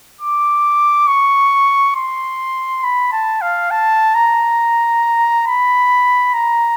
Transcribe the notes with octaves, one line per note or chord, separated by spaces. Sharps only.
D6
C#6
C6
B5
A5
F5
A5
A#5
B5
A#5